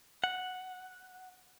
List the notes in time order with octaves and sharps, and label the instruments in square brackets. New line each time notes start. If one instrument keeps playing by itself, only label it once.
[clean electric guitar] F#5